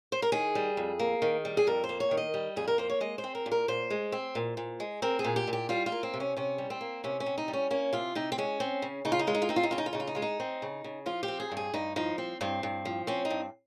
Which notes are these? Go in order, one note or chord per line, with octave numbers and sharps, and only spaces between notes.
C5
A#4
D#3 G#4
G3
F2
A#3
D#3
G3
G#4
F2 A#4
C5
A#3
C#5
D#3
D#5
G3
F2 G#4
A#4
A#3 C5
C#5
G#3 D#5
C5
C4
A#4
A#2
A#4
A#2 C5
G#3
C4
A#2
A#2
G#3
C4 A#4
G#4
A#2
G4
A#2
G4
G3 F4
F4
A#3
C4
C3
C#4
C3 C#4
G3
C4
A#3
C3 C#4
C#4
C3
D#4
G3
C#4
A#3 C#4
C3 F4
C3 D#4
C4
G#3 C#4
C4
C#3
C#3 D#4
F4
D#4
G#3 F4
D#4
F4
C4 D#4
F4
D#4
C#3 F4
D#4
F4
C#3 D#4
F4
D#4
G#3 F4
D#4
C4
C#3
C#3
F3 F4
G4
C4
G#4
G2
G#4
G2 D#4
F3 D#4
C4
G2 C4
G2
F3
C4 C#4
D#4
G2